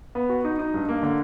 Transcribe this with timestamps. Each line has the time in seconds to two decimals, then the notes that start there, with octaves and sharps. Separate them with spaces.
0.15 B3
0.29 F#4
0.45 D#4
0.59 D#4
0.74 G2
0.89 A#3
1.03 D3